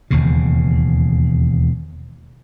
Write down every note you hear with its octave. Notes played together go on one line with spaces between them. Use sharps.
E1 D#2 C#3